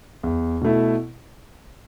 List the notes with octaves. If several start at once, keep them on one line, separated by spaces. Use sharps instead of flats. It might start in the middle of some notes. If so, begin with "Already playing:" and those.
E2
B2 A3 E4